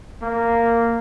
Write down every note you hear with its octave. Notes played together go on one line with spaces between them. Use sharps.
A#3